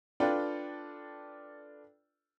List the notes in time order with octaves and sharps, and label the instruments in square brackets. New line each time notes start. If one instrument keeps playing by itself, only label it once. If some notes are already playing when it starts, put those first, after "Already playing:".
[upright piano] D4 F4 A4 B4 D5 G5